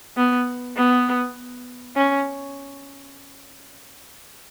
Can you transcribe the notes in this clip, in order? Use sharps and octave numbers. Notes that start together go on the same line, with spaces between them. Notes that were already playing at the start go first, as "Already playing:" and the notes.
B3
B3
C#4